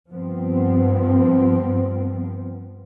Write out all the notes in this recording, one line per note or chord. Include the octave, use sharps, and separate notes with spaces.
G2 F3 B3 C4